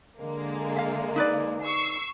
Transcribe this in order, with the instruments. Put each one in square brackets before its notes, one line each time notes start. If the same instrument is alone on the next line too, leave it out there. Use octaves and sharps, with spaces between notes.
[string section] D3 G#3 A#3
[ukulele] E5 F5
D#4 B4 D5
[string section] C#6 E6 C7